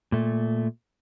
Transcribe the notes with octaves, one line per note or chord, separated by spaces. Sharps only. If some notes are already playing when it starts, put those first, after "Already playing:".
A#2 A3